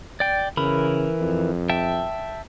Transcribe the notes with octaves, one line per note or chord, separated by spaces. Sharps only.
D5 G5
C#3 E3 A#4 B5
F2
E5 G5 A5